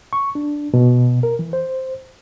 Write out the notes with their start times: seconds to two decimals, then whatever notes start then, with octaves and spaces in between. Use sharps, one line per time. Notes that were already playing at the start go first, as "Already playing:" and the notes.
0.13 C#6
0.35 D4
0.74 B2
1.23 A#4
1.39 E3
1.53 C5